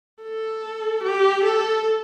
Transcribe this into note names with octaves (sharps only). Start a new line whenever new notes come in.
A4
G4
A4